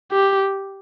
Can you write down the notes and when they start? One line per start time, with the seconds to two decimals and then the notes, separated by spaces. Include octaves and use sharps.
0.12 G4